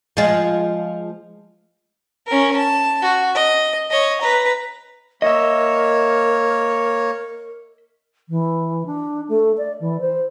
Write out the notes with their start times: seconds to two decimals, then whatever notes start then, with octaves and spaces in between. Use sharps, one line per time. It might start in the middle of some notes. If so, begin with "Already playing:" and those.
0.17 F3 G#3
2.27 C#4 A#4
2.57 A5
3.02 F#4
3.35 D#5
3.90 C#5 D#5
4.21 B4 A#5
5.22 A#3 A#4 C#5 D#5 E5
8.29 E3
8.86 D4
9.28 A3
9.57 D5
9.80 E3
10.00 C5